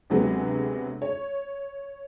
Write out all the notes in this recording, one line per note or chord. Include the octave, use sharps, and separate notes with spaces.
D2 C3 F#3 G#3 B3
C#5